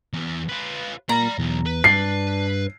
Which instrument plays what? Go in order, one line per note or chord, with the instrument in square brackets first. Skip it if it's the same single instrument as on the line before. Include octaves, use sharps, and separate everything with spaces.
[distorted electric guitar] E2 E3
F4 B4
[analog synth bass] A#2 [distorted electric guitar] D5 B5 [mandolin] A#5
[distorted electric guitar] B1 [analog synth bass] E2
[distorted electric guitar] B4
[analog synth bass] G2 [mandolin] D4 [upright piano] C7